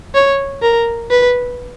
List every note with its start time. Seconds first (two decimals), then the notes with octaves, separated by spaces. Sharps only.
0.15 C#5
0.62 A#4
1.11 B4